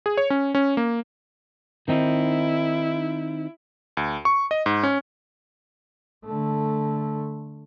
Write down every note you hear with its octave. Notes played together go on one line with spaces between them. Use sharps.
G#4
C#5
C#4
C#4
A#3
D#3 C4 D#4 E4
D2
C#6
D#5
G#2
C#4
D3 A3